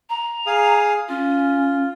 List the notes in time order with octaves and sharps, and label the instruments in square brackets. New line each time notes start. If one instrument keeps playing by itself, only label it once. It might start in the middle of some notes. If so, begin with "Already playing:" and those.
[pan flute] A#5
[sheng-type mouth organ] G#4 F5 D#6
[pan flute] C#4 [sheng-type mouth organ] F4